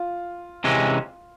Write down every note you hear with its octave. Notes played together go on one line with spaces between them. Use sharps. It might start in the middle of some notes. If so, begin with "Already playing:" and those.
Already playing: F4
C3 E3 G#3 C#4